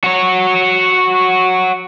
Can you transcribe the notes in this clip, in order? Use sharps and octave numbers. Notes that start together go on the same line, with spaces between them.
F#4 C#5